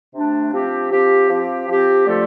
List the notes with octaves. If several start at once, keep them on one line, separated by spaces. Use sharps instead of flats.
C3 A3 D4
F3 C4 G4
F3 C4 G4
F3 C4 G4
F3 C4 G4
D3 F3 A3 F4 A4